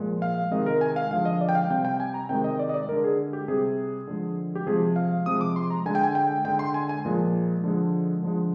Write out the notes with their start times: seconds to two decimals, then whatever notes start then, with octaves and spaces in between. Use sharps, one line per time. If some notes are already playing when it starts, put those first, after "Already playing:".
Already playing: A#2 F3 G#3
0.22 F5
0.51 C3 D#3 G#3 D#5
0.66 A#4
0.81 G#5
0.96 F5
1.11 D3 F3 G#3 F5
1.25 D#5
1.41 D5
1.49 G5
1.55 F5
1.70 C3 G3 G5
1.85 G5
2.00 G#5
2.14 A#5
2.29 C3 D#3 G#3 G5
2.44 D#5
2.59 D5
2.69 D#5
2.74 D5
2.89 D3 G#3 A#4
3.04 G#4
3.33 G4
3.48 C3 G3 G#4
4.07 D3 F3 G#3
4.55 G4
4.66 C3 F3 G#3 G#4
4.96 F5
5.26 C3 F3 G#3 D#6
5.41 D6
5.56 C6
5.70 A#5
5.86 D3 G#3 G#5
5.95 G5
6.03 G#5
6.15 G5
6.45 D3 G#3 G5
6.59 C6
6.74 G#5
6.89 G#5
7.05 A#2 F3 G#3
7.64 D3 F3 G#3
8.23 D3 F3 G#3